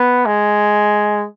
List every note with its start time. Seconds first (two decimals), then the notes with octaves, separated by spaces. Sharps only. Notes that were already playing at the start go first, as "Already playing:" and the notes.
Already playing: B3
0.26 G#3